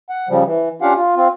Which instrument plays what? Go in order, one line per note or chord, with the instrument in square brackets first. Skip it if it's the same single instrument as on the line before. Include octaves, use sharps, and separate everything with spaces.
[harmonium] F#5
C#3 F3 G3
E3
C#4 D4 F4 G4 F5 F#5
F4
C4 F4